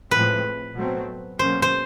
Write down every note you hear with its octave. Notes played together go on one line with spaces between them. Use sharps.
A2 F3 G#3 C4 B4
B2 F#3 A3 C4
B2 F#3 A#3 C#4 C5
C5